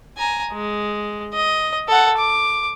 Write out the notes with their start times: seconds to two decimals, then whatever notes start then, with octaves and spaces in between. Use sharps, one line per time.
0.17 G#5 A#5
0.53 G#3
1.33 D#5
1.88 A4 F#5
2.17 D6